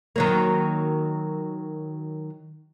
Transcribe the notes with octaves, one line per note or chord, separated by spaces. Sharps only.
D#3 F#3 A#3